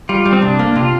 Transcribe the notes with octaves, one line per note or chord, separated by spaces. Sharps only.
G3 F4
G3
C4
C2 D4
A#3
C3 F4